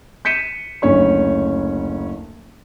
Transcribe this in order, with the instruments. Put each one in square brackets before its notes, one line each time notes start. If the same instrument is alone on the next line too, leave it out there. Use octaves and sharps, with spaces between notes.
[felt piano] G6 B6 C#7 D#7 E7
F#1 D2 C#4 C#5 C#6